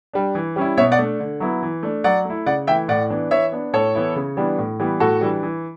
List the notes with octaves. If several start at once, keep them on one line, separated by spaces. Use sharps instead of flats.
G3 D4
E3
G3 C#4 E4
B2 C#5 E5
D5 F#5
A3 D4
D3
F#3 B3 E4
E3
A3 D4
F#3 D5 F#5
A3 E4
C#3 D5 F#5
E3 A3 E4 E5 G5
A2 D5 F#5
E3 B3 D4
E3 C#5 E5
B3 D4
A2 A4 C#5
E3 B3 E4
C#3
E3 G3 B3 D4
A2
E3 G3 B3
A2 F#4 A4
E3 G3 D4
E3